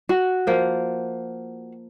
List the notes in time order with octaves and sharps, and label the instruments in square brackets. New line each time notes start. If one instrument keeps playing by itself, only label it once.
[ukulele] F#4
[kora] F3 A#3